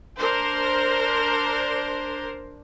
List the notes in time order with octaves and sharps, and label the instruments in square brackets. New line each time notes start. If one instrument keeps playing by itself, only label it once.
[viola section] D4 A#4 C5